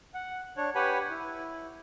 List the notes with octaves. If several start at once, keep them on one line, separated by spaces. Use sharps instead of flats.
F#5
D4 C#5
G4 B4 C#5 F#5 G#5 B5
E4